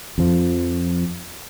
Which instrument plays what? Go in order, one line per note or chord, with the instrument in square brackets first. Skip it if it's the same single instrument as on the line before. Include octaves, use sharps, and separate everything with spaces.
[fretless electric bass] F2 F3